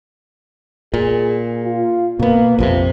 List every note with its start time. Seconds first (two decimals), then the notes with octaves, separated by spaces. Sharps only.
0.94 A#2 G#4
1.65 F4
2.19 B2 A#3 B3
2.59 A#1 F2 C3 F3